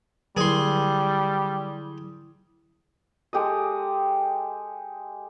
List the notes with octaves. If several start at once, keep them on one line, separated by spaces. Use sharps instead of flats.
D3 F#3 G3 E4 G#4 C6
G#3 G4 A4 D#5